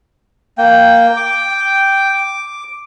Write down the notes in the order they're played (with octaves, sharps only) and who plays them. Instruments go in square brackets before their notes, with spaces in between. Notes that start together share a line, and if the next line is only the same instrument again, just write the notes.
[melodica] A#3 [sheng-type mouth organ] G5
[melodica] D6